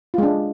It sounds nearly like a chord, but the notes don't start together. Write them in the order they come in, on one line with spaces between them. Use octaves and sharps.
F4 G#3 D4